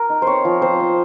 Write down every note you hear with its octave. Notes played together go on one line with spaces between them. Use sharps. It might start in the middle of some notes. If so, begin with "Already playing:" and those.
Already playing: A#4
D#4
C4 C5 C#5
F3
C4 C5
C4